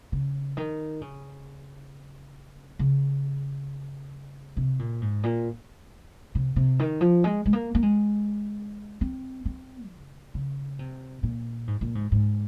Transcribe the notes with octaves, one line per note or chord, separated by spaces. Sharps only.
C#3
D#3
C#3
C#3
C3
A#2
G#2
A#2
C3
C3
D#3
F3
G#3
G#3
A#3
A#3
G#3
C4
C4
C#3
C#3
C3
A#2
G#2
A#2
G#2
G#2